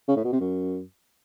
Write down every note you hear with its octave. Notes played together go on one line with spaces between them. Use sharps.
C#3
A2
B2
C3
F#2